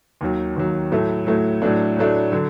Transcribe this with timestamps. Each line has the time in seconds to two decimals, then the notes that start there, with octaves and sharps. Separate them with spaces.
0.21 D#2 D#3 F#3
0.56 D#2 D#3 F#3
0.92 A2 F#3 A3
1.27 A2 F#3 A3
1.62 A2 F#3 A3 D4
1.97 A2 F#3 A3 D4
2.32 D3 F#3